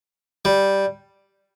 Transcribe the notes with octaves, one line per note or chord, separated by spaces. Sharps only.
G3